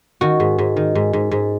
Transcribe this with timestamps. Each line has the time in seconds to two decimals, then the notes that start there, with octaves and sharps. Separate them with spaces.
0.21 D#3 F#4
0.40 G#2
0.58 G#2
0.76 D#3
0.95 G#2
1.13 G#2
1.31 G#2